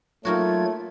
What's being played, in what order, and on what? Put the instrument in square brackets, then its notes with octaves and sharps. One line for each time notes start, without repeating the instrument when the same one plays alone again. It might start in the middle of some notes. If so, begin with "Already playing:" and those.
[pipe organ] F#3 G#6 [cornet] A3 [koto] A#3 D#4 F#4 [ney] F4